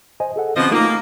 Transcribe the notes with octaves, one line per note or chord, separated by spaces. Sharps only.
C5 D#5 G#5
G#4 A4 F#5
B2 D3 F3 C4 C#4 D#5
A3 A#3 D#4 F4